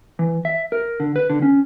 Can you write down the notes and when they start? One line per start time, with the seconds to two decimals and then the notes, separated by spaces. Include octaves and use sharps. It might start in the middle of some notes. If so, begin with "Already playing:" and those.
0.19 E3
0.45 E5
0.72 A#4
1.00 D3
1.16 B4
1.30 D3
1.42 C#4